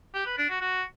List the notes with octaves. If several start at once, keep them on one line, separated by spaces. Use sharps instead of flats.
G4
B4
D4
F#4
F#4